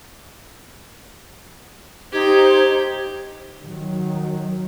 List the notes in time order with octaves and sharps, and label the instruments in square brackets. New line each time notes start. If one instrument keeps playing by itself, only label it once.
[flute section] D#4 C5 G#6 [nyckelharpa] G4
[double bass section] D#3 F#3